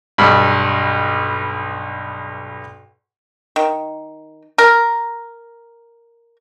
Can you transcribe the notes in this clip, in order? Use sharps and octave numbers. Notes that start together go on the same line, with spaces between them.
B1 G2
D#3
A#4